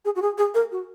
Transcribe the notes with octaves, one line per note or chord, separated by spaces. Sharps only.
G#4
F#4
G#4
G#4
A#4
F#4